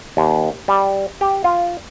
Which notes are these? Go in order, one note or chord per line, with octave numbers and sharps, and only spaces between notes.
D#2
G3
G4
F4